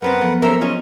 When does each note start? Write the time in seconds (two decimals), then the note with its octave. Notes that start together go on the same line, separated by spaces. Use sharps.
0.02 F#2 B3 C4 A#4 B4 F#5
0.21 F3 F#3 A3 B3
0.42 A#3 C#4 A4 A#4 C5 E5 E6
0.61 C#4 F4 G#4 C#5 D#5